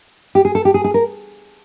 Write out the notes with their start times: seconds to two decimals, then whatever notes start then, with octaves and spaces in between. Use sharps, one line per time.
0.35 G4
0.45 G#4
0.55 A4
0.65 G4
0.74 G#4
0.84 G#4
0.94 A#4